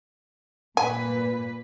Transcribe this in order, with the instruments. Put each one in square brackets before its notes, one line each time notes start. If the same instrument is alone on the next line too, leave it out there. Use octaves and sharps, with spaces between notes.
[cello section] A#2 B4 [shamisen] G#5